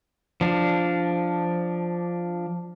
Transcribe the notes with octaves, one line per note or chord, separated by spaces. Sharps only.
F3 D4